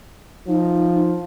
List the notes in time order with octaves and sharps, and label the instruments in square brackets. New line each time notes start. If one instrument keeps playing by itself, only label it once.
[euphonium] F3 [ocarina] D#4